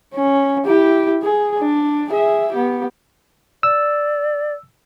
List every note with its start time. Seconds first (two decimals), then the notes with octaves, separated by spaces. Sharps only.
0.14 C#4
0.66 E4 G4
1.22 G#4
1.59 D4
2.08 G#4 E5
2.52 B3 G4
3.63 D5 E6